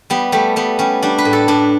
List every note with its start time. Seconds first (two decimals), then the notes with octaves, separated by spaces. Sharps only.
0.10 G3 B3
0.32 G3 A3
0.56 G3 B3
0.79 G3 C#4
1.03 G3 D4
1.18 B4
1.25 A2
1.33 A4
1.48 A2 D4